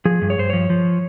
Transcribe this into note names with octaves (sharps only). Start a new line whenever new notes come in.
F3 G#4
G2
C#5
G2 C5
F3 C#5
F3